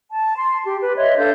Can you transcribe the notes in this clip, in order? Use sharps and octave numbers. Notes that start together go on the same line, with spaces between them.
A5
C6
G4
B4
C#5 D#5 E5 C6
D4 A4 F5 G6